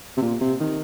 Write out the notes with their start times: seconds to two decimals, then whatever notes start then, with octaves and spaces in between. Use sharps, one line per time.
0.17 C3
0.22 A#2
0.41 C3
0.60 D#3